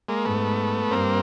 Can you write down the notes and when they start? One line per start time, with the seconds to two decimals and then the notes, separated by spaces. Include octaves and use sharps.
0.09 G#3 A#3
0.25 G#2 A3 B3
0.91 G2 A#3 C4